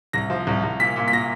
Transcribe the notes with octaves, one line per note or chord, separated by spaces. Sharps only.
C2 A#6
F3
C2
C2
A#2 B6
A#2
B6
A#2 A#6